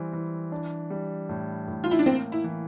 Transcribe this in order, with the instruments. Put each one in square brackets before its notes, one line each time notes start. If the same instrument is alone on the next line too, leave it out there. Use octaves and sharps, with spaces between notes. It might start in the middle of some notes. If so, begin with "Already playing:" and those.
Already playing: [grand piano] E3 G3 C4
E3
D4
G3
A2
A2
[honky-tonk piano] F4
E4
D4
[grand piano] A#3 [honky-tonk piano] C4
[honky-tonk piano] E4
[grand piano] E3